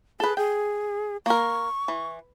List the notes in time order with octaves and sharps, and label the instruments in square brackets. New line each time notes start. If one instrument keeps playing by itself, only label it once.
[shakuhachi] G#4 [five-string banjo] A4 B4
[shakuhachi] G#4 [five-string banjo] G5
[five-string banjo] A#3 A#4 [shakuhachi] C#6
[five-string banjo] E3